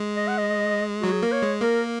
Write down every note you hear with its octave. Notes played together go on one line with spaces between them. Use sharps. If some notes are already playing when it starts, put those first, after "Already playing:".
Already playing: G#3
D#5
F#5
D#5
F#3 F#4
G#4
A#3 A#4
C#5
G#3
A#3 A#4